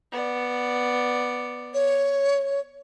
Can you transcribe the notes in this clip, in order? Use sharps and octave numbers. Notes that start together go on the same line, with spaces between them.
B3 D5
C#5